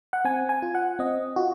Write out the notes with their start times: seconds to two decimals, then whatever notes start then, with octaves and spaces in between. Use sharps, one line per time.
0.13 F#5
0.25 C4 G#5
0.49 G#5
0.62 F4
0.75 F#5
0.99 C4 D#5
1.36 F4 F#4